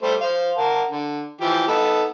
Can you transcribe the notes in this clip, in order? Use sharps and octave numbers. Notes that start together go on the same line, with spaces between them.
G3 A3 C5
C5 F5
A#4 F#5 A5
D3
E3 F3 G4
B3 D#4 A4